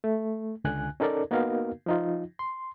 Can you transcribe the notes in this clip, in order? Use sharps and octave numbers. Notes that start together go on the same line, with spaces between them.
A3
C#2 D3 G#5 F#6
C#4 D#4 A4 A#4 D5
A#3 B3 D#4 F#4 A#4 F5
F3 D#4 F4
C6